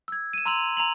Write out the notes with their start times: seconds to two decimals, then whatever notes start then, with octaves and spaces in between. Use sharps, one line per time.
0.08 E6 G#6
0.33 D#7 E7
0.46 A#5 C6 E6 F7 F#7
0.77 A#5 F7 F#7